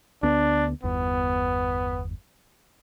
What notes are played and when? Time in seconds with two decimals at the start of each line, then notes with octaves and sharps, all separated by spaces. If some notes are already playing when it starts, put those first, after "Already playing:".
0.23 D2 B3 D4
0.84 G1 E2 B3